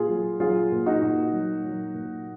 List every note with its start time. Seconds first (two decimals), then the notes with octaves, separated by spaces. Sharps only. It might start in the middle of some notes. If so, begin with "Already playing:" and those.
Already playing: A#2 F4 G#4
0.09 F#3
0.40 F#3 F4 G#4
0.72 A#2
0.86 D#4 F#4
1.02 A#2
1.33 F#3
1.64 F#3
1.94 A#2